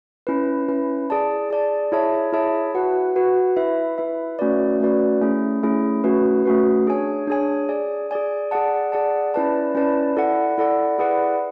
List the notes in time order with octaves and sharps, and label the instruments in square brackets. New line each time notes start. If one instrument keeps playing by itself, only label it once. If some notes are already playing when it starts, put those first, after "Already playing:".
[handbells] C#4 E4 B4
C#4 E4 B4
G#4 D5 A5
G#4 D5 A5
E4 G#4 C#5 E5 A5
E4 G#4 C#5 E5 A5
F#4 B4 F#5
F#4 B4 F#5
E4 B4 E5
E4 B4 E5
A3 C#4 F#4 B4 D5
A3 C#4 F#4 B4 D5
A3 C#4 E4 G#4
A3 C#4 E4 G#4
A3 C#4 F#4 B4
A3 C#4 F#4 B4
D4 G#4 C#5 G#5
D4 G#4 C#5 G#5
G#4 D5 G#5
G#4 D5 G#5
G#4 D5 F#5 A5
G#4 D5 F#5 A5
C#4 E4 B4 D5 A5
C#4 E4 B4 D5 A5
E4 A4 D5 F#5
E4 A4 D5 F#5
E4 G#4 B4 D5 F#5